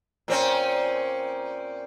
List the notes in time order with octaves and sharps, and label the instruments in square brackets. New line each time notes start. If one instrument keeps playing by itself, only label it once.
[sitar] A#2 C4 C#4